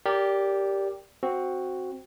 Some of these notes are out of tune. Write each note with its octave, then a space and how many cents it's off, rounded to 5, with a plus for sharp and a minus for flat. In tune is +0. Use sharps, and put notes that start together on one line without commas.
G4 +0 A#4 -10 D5 -20
C4 +5 F#4 +0